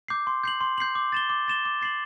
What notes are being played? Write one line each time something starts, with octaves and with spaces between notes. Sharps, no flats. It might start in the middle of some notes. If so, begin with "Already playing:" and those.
D6 G6 C7
C6
G6 C7 F#7
C6
G6 C7 F#7
D6
A6 E7 G7
D6
A6 E7 G7
D6
A6 C7 F#7